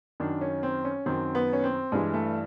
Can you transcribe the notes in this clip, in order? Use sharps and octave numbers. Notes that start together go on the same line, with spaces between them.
F#2 D#3 D4
C#4
C4
C#4
F#2 D#3 C4
B3
C#4
C4
G2 E3 G#3
A3